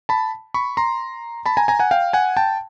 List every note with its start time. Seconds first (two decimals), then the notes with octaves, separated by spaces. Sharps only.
0.09 A5 B5
0.54 B5 C#6
0.77 A#5 C6
1.46 A5 B5
1.57 G#5 A#5
1.68 G#5 A#5
1.79 F#5 G#5
1.91 F5 G5
2.13 F#5 G#5
2.37 G5 A5